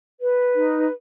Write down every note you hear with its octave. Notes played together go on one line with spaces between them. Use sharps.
B4
D#4